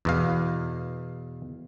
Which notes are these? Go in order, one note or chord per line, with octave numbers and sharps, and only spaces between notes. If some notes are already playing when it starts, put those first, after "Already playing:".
E2 B2 F5